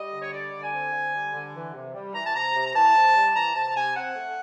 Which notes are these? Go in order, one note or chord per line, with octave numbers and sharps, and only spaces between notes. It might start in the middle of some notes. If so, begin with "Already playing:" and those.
Already playing: G3 D#5
D3
C#5
G3 D5
D3
G#5
C4
D3
G3
D3
E3
C3
G3
E3 A#5
A5
C3 A#5
C3
A#5
E3 A5
C3
G3
E3 A#5
C3 A5
C3 G#5
C4 F#5
A3